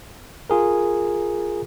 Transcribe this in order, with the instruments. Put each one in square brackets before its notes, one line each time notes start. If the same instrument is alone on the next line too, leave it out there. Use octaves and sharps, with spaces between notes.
[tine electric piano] F4 G#4 A#4